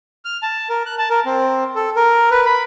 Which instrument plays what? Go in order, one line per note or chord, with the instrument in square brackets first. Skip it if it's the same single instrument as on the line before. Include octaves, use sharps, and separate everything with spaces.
[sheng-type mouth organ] F6
A5
A#4
F#6
A5
A#4
C4
A4
A#4
B4
B5